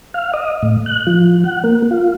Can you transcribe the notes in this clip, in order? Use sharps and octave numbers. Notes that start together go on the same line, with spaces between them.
F5
D#5
A2
F#6
F3
F#5
A#3
F4